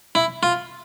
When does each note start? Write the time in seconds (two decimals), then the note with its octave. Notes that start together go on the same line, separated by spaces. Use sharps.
0.15 E4
0.43 F4